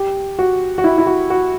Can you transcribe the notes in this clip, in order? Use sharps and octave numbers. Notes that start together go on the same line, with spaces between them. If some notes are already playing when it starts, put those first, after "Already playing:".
Already playing: G4
F#4
F#4
E4
E4
F#4
F#4